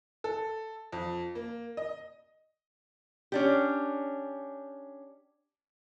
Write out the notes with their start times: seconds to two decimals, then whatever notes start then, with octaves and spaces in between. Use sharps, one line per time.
0.24 A4
0.92 F2
1.35 A#3
1.77 D#5
3.32 C#4 D4 G4